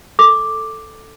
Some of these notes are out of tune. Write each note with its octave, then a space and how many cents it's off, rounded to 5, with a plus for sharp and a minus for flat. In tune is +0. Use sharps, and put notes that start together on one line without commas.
A4 +0 D6 +0